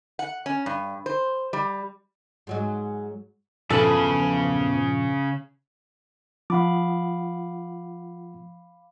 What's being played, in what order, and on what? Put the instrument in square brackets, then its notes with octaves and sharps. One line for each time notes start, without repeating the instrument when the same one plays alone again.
[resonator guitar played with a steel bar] F#5
C#4
G2
C5
G3
[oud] G#2 F#3 G#3
[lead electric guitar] E2 B4 [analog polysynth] G2 A#2 F3 [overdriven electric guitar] C#3 [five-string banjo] A4
[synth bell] F3 [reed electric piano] F4 F#5 [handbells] F5 B5 D6